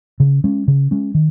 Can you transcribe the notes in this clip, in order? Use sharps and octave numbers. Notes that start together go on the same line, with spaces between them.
C#3
G#3 C#4
C#3
G#3 C#4
D#3